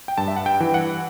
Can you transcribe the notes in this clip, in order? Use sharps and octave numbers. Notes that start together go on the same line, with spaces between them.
G5
G2 A5
E5
F#5
G5
E3
F#5